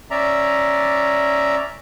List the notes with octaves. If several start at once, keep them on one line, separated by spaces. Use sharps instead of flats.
C#4 D5 E5 A#5